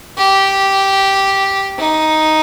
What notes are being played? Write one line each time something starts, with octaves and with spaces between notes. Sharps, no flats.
G4
D#4